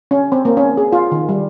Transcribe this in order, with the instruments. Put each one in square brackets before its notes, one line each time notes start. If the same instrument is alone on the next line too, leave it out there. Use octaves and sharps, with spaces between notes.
[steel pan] C#4
C4
A#3
C#4
G#4
F4
D#3
G3